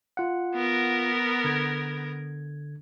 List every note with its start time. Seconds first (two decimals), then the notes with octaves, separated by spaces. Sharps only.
0.17 F4 F#5
0.55 B3 A#4
1.44 D3 G#6